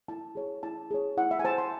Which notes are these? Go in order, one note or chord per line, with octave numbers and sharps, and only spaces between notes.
E4 A5
G#4 C#5
E4 A5
G#4 C#5
E4 F#5
E5
G#5
C5 A5
C6